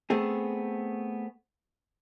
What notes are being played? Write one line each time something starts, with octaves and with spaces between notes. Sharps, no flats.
A3 B3 C4 G#4